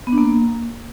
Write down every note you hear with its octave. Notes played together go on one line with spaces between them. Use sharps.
B3
D4
A#3